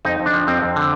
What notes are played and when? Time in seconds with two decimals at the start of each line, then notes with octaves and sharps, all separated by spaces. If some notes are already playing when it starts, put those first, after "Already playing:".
0.05 F2 D#4
0.20 F2
0.26 D4
0.34 F3
0.47 F2 C4
0.62 F2
0.76 D3